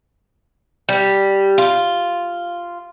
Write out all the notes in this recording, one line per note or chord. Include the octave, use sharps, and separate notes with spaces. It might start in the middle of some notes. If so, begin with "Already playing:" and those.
G3
F4